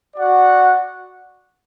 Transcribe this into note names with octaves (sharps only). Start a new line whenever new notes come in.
F#4 D5 F#5